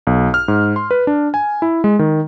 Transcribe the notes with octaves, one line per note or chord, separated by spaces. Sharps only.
B1
F6
G#2
C6
B4
D4
G#5
E4
G#3
D#3